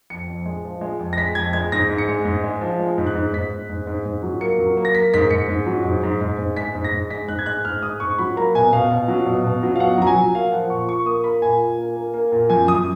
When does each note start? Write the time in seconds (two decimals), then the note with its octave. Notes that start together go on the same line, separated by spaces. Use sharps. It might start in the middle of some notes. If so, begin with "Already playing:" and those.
0.10 F2 C#7
0.28 F2
0.46 G#3
0.64 F3
0.81 G#3
0.99 F2
1.13 A#6
1.17 G#3 B6
1.35 F2 G#6
1.53 G#3 G#6
1.72 G#2 A#6
1.90 G#2
1.98 C#7
2.08 G#3
2.25 G#2
2.44 G#3
2.61 F3
2.79 G#3
2.98 G#2
3.07 F#6
3.15 G#2
3.33 G#2 B6
3.52 G#2
3.70 G#2
3.87 G#2
4.06 G#2
4.23 F#3
4.41 A#3 C#7
4.59 F#3
4.77 A#3
4.85 A#6
4.95 A#3 B6
5.14 G#2 B6
5.31 G#2 C#7
5.49 G#2
5.66 F#3
5.85 G#2
6.03 G#2
6.21 G#2
6.39 G#2
6.57 G#3 B6
6.75 G#2
6.84 A#6
6.93 G#2
7.10 G#3 B6
7.28 G#2 F#6
7.39 G#6
7.46 G#3 F#6
7.65 G#2 F6
7.82 G#3 D#6
8.00 G#2 C#6
8.19 F#3 B5
8.36 A#3 A#5
8.55 B2 G#5
8.72 B2 F5
8.91 B2
9.08 F#3
9.26 B2
9.44 B2
9.63 F#3
9.76 F5
9.80 B2 F#5
9.98 F#3 A#5
10.07 G#5
10.17 F#3
10.34 A#3 F5
10.52 F3 F#5
10.70 A#2 C#6
10.88 A#2 C#6
11.06 A#3 D#6
11.24 A#3 B5
11.42 A#2 G#5
11.61 A#2
11.78 A#3
11.96 A#3
12.14 A#3
12.32 A#2
12.50 F#2 G#5
12.68 F#2 D#6